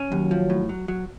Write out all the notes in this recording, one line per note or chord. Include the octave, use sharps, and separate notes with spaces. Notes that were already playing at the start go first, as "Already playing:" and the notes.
Already playing: C#4
D#2 F#3
F3
A2
F#3
F#3